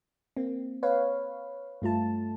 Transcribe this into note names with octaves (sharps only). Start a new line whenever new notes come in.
A#3 C4
B4 C#5 F5
G2 A3 F4 A5